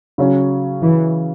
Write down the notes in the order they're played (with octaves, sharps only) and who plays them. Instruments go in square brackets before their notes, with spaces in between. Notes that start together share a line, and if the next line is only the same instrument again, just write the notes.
[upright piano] C#3 F#3 C#4
[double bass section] E3